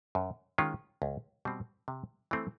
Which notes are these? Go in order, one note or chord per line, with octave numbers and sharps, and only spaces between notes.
F#2
D#3 G#3 C#4 F4
C#2
B2 G3 C4
C3
E3 A3 C4